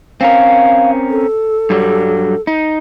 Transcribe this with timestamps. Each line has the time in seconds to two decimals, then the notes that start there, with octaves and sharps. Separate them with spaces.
0.21 C4 C#4 A#4 F5
1.09 A4
1.70 G2 F#3 G3
2.47 D#4